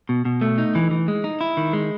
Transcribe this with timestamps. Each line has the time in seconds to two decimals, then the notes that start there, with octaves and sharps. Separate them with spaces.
0.09 B2
0.25 B2
0.41 A3
0.58 D#4
0.75 E3
0.91 E3
1.08 G#3
1.24 D#4
1.41 E4
1.57 D#3
1.73 G#3